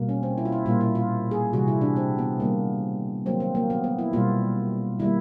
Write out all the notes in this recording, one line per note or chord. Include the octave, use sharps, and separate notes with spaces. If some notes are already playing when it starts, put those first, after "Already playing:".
Already playing: B2 G3 A#3
C#4
C4
E4
F4
E4
A#2 G3 A#3 F4
E4
F4
G#4
C3 E3 G3 F#4
E4
D4
C4
B3
D#3 G3 A#3
D#3 F#3 A#3 C4
C4
A#3
B3
B3
E4
B2 G3 A#3 F4
D#3 G3 A#3 E4